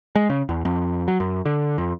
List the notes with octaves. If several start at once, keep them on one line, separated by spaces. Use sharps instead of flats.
G#3
C#3
E2
F2
F#3
F#2
D3
F2